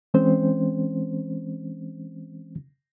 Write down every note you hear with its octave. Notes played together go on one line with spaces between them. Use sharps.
E3 G#3 C4 C#4 C5